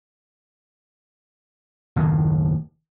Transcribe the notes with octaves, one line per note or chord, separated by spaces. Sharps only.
F#1 D#2 A2 D#3